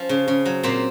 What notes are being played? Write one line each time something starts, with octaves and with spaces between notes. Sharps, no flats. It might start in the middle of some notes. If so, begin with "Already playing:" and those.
Already playing: F3 C#4
C#3
C#3
F#3
A#2 C4 C5